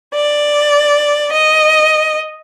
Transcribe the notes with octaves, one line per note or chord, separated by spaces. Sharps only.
D5
D#5